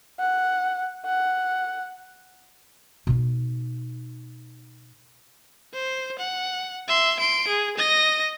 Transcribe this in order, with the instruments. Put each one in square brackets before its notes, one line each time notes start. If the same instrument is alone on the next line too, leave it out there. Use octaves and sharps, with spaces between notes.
[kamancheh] F#5
F#5
[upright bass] B2 D#4
[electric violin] C5
F#5
E5 C6
C6 D7
G#4
D#5 A#6